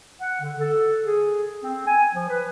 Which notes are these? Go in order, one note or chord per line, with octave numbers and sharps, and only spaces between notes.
F#5
D3
A4
G#4
C4
G#5
F3
B4